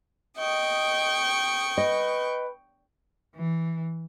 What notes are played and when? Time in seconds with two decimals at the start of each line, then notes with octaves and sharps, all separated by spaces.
0.38 D#5 G5 C#6 D#6
1.78 B4 D#5
3.34 E3